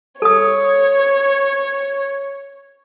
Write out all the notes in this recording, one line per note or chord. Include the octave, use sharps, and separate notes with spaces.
A4 C#5 D#6